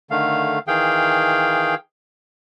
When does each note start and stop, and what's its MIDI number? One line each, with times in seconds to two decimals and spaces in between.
0.11 0.59 50
0.11 0.59 51
0.11 0.59 57
0.11 0.59 77
0.68 1.75 51
0.68 1.75 52
0.68 1.75 68
0.68 1.75 77
0.68 1.75 79